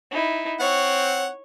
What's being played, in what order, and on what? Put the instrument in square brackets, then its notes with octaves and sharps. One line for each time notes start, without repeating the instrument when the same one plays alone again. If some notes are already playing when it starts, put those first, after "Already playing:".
[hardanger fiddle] D#4 E4
[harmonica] C4 F#5 [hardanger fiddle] C#5